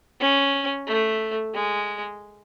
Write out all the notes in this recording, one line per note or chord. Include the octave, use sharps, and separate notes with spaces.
C#4
A3
G#3